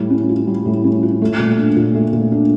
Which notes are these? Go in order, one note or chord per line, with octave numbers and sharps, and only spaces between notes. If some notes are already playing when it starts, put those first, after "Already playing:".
Already playing: A2 G3
C#4
F4
G3
A2
C#4
F4
A3
A#2
D4
A#2
A3
A#2
D4